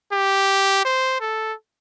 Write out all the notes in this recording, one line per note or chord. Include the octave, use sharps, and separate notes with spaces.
G4
C5
A4